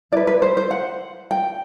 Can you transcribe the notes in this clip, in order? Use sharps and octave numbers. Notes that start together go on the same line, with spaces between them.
E4 B4 D5
B4
C5
C5
F#5
G5